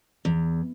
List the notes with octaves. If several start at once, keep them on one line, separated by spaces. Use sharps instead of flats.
E2